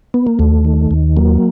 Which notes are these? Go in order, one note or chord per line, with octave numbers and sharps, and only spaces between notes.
B3
A#3
D#2 A3
D#3
D#2
F#3 A#3